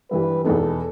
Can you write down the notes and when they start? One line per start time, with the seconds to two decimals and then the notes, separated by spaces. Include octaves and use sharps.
0.11 G2 E3 G3 B4
0.44 E2 B2 G#3 B3 D#4 A4